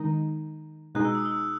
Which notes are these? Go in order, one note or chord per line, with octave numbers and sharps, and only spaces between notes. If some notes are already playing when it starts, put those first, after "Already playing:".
Already playing: D#3 G#3 D#4
B2 G#3 D#4 G#4 F#6
E6
D#6
E6